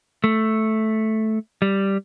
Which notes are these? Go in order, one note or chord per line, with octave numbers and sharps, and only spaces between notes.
A3
G3